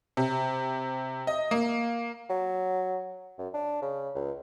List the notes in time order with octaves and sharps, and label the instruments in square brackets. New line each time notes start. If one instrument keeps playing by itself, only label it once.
[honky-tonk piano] C3
D#5
A#3
[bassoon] F#3
F#2
D4
C#3
C#2